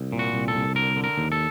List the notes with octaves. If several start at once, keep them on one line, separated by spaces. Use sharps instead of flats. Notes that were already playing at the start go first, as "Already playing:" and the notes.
Already playing: C2
A#2
F#4
C2
A4
C2
D3 A#4
D3
A#4
D#2
A4